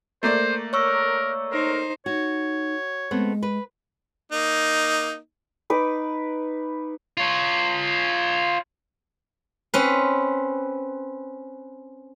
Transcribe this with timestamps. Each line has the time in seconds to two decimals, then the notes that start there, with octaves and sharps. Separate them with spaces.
0.23 A3 A#3 C5 D5
0.73 A#4 C#5 C#6 E6
1.52 D#4 A#4 C5
2.06 D#4 F#4 C#5
3.11 G#3 A3 B3 C4
3.43 B4
4.32 A#3 D#4
5.70 D#4 B4 D6
7.17 F4 C#5
9.74 C4 C#4 B4